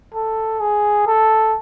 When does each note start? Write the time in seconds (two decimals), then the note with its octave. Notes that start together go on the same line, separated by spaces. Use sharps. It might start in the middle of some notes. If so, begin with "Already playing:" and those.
0.14 A4
0.60 G#4
1.07 A4